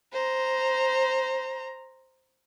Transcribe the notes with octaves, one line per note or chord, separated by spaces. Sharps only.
C5 A#5